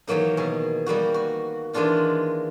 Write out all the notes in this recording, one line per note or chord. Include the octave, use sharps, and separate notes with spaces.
D#3 E3 F#3 A#3 D#4
B2 G#4
G3 A#3 B3 F#4
F#4
D#3 E3 G#3 D4 F4 F#4